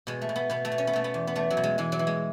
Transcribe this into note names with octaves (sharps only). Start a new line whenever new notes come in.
B2 G#3
A3
B2
B3
B2 B3
A3
B2
C#4
B3
B2 A3
B3
E2
B3
E2 A3
F#3
B2
G#3
E3 G#3
F#3
E3
G#3